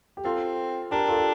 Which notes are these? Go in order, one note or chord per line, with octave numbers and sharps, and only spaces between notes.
G4
C4 F4 A4
D4 G4 A#4
F4 A4
G4